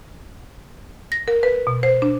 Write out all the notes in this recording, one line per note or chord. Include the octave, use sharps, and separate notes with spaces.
A#6
A#4
B4
B2
C5
D4